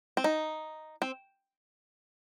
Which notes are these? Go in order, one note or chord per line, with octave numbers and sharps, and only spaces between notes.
C4
D#4
C4